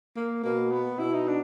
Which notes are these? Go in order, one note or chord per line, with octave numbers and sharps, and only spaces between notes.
A#3
B2 A#3
B3
B2 E4
D#4
D4